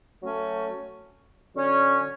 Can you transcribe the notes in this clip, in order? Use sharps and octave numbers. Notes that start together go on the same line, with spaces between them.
F#3 A3 C#4
D3 F#3 C#4